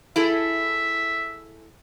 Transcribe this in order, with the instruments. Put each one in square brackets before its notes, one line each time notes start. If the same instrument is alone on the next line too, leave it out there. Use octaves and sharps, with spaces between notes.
[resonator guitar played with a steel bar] E4 G#4 A4 [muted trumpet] E5